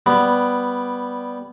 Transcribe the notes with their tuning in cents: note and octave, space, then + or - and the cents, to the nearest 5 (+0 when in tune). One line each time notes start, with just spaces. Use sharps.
G3 +0 B3 +0